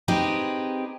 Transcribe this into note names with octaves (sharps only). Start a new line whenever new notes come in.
C4 D#4 G4 G#4 B4